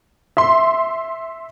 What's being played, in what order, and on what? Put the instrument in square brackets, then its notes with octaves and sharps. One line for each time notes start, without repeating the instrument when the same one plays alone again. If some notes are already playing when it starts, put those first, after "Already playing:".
[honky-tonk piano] E5 C6